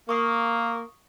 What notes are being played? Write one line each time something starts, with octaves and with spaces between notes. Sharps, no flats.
A#3 C#6 D#6